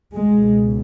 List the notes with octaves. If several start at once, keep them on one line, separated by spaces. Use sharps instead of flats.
C#2 B2 G#3